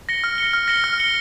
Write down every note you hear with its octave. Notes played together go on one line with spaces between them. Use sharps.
A#6 C#7 G7
F6
A#6 C#7 G7
F6
A#6 C#7 G7
F6
A#6 C#7 G7